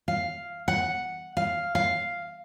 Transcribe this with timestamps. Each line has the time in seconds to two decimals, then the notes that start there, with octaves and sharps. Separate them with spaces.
0.08 F5
0.68 F#5
1.37 F5
1.75 F5